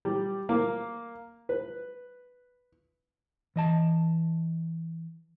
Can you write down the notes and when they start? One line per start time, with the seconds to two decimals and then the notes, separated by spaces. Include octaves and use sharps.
0.05 G3
0.49 A#3
1.49 B4
3.56 E3 D#5 A5